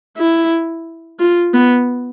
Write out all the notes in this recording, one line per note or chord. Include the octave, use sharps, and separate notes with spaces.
E4
F4
B3